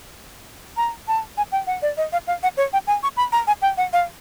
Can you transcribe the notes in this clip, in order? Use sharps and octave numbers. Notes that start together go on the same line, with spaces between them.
A#5
A5
G#5
G5
F#5
D5
D#5
F5
F5
F#5
C#5
G5
G#5
C#6
B5
A#5
G#5
G5
F#5
F5